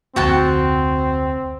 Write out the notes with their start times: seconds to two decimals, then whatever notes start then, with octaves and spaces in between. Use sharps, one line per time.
0.16 F1 D2 C4 F#4 G5 A5